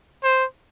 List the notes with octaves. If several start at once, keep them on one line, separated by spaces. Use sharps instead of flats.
C5